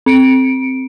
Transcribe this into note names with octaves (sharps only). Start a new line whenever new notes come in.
C4 C#7 D7